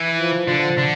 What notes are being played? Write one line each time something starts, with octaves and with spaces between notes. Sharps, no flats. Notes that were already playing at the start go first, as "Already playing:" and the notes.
Already playing: E3
F3
D3 F3
D3